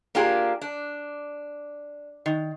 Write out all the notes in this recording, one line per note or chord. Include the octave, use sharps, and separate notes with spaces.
A#3 D4 F4 G4 G#4 A#4
D4
D#3